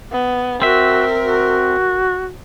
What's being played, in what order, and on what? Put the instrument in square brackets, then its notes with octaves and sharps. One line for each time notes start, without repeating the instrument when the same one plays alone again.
[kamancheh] B3
[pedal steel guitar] C4 E5 [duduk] F#4 [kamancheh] A#4
[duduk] F#4